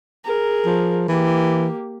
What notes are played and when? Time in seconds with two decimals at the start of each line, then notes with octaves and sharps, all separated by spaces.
0.24 G#4 A#4
0.66 F3
1.08 E3 A#3 G4